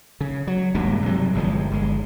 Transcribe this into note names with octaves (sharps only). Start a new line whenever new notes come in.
C#3
F#3
D#1 G2 A#2 G#3
C3 F#3 G3
G1 G2 F3 G#3
G1 G#3